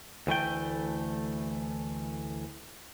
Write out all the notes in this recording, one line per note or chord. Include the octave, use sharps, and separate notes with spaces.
D2 E3 A3 G5